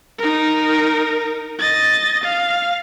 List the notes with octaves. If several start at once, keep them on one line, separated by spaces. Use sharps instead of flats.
D#4 A#4
D#5 A6
F5